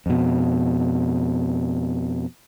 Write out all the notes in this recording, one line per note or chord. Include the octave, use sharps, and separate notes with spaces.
F2 B2